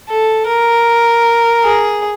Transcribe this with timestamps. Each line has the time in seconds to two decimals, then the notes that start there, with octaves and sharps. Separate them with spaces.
0.10 A4
0.48 A#4
1.64 G#4